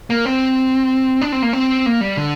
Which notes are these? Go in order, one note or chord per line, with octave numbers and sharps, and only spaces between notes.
A#3
C4
D4
C4
A#3
C4
A#3
G3
D3